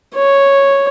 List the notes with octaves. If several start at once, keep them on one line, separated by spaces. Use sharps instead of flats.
C#5